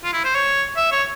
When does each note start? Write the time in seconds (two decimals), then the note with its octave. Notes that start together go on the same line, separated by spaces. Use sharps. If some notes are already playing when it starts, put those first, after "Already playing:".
0.04 F4
0.13 E4
0.24 C5
0.35 C#5
0.76 E5
0.92 C#5